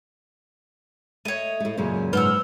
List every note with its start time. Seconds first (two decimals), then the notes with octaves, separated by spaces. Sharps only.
1.25 A3 C#5 D#5
1.60 A2 A3
1.78 F#2 A#2 C#3
2.13 G#2 B4 C5 F#5 E6 F6